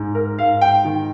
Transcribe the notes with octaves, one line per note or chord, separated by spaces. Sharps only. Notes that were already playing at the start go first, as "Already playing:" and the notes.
Already playing: G#2
A#4
G#2 F5
G5
D#3